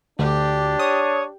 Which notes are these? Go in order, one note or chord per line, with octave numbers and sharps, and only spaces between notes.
D2 D4 G4
C#5 D#6